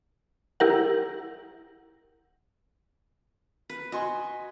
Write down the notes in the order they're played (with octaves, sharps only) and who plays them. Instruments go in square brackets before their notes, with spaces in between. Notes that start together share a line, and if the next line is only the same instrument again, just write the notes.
[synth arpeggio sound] E4 G4 A#4 F#5
[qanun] B4
[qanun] F#4 [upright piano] D#5 G#5 C6